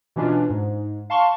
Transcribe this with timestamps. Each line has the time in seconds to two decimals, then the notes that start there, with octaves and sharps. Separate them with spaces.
0.16 B2 E3 C#4 D4 F4
0.50 G#2
1.10 F5 A5 C6 C#6